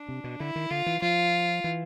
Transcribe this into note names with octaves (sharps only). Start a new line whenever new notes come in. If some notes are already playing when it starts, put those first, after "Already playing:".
Already playing: D4
C3
B2
D3 E4
D#3
D3 F4
E3
F3 F4
E3